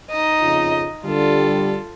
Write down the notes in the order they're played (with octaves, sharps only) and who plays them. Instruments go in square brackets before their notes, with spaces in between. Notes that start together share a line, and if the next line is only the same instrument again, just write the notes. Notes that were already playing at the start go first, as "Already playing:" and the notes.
[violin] D#4 D#5
[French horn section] F2 C#3 F4
[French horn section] D3 G3 [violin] F4 A4